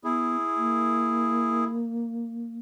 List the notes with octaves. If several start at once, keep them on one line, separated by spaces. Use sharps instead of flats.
B3 E4 G#4
A#3